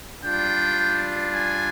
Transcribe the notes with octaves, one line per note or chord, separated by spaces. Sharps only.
G3 D4 F4 G5
G#5